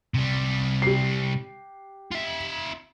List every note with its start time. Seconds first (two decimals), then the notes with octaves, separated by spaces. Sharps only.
0.14 C3 G3
0.82 G4 C7
2.12 F4 E5